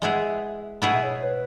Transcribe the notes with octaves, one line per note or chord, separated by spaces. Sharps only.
G#3 B3 E4 G#4 E5
B2 B3 E4 G#4 E5
E5
C#5
B4